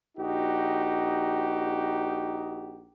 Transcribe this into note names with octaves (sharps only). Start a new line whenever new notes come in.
A#1 D#4 F#4 G4